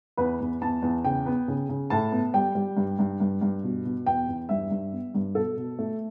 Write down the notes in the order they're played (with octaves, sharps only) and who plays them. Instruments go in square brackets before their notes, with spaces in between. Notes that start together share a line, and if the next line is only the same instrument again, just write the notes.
[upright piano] E2 B4
E2
E2 A5
E2
C#3 G5
B3
C#3
C#3
A2 A5
B3
G3 G5
G3
G2
G2
G2
G2
B2
B2
E2 G5
E2
G2 E5
G2
B3
G2
B2 A4
B2
A3